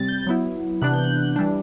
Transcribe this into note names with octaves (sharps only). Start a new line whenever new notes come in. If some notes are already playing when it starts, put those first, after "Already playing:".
Already playing: C3 G3 C4 A6
G6
F#3 B3 E4
C3 E3 B3 D4 F#6
G6
F#6
E3 G3 D4